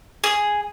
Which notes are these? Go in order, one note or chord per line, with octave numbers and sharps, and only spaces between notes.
G#4